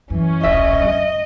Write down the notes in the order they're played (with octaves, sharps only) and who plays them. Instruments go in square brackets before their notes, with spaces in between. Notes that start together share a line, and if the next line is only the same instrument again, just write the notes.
[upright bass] F#2 [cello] E3 [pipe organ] C#4
[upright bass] D1 A#1 [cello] D#5 [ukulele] E5
[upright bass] F#2 C#3